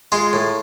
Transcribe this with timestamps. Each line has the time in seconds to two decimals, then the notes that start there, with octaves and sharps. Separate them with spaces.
0.12 G#3 F4
0.33 A2